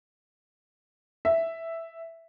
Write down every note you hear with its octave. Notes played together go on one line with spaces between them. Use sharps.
E5